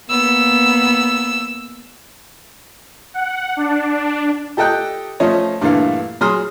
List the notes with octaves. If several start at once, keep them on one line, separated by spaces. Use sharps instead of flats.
A#3 B3 E6
F#5
D4
D4
G4 A4 D#5 G5 F#6
F3 A3 C#4 F4 C#5 D#5
G2 A#2 D3 E3 A3 F5
F#3 G#4 C6 D#6 F6